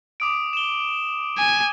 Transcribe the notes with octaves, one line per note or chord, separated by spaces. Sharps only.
D6 D#6 D7
E7 G7
G#5